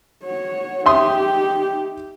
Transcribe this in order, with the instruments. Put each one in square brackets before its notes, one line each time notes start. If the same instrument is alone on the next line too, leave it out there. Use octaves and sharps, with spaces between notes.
[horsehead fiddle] F#4 C#5
[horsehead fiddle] D#4 G4 [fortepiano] E5 C6 D#6